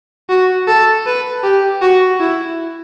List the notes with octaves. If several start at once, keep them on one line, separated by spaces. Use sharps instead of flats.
F#4
A4
B4
G4
F#4
E4